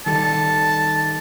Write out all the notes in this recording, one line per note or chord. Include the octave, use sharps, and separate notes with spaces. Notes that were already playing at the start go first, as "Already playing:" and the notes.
D#3 G3 A4 A5